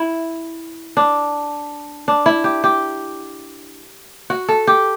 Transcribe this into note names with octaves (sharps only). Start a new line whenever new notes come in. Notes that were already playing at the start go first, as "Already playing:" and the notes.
Already playing: E4
D4
D4
E4
G4
G4
F#4
A4
G4